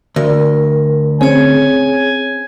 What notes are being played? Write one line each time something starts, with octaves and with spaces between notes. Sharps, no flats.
D2 A#4
C4 C#4 G#4 C#5 G#5